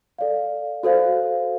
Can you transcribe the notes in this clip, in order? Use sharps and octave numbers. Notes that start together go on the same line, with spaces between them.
A4 D5 F5
F#4 A4 C5 F5